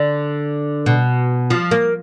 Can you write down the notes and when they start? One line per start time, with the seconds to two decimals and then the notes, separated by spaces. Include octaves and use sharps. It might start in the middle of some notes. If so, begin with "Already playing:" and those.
Already playing: D3
0.86 B2
1.50 F3
1.71 A#3